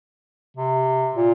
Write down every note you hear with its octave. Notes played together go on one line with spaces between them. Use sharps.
C3
A#2